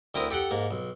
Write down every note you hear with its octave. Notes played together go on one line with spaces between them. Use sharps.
D2 C4 E4 A#4 D#6
G4 A4 F#5 G5
G#2 A#3
B1